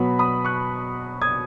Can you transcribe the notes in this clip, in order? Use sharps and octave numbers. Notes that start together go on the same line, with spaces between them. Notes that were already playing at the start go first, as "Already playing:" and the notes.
Already playing: B2 F#3 B3 B5
B5 D#6
C#6 F#6
D#6 G#6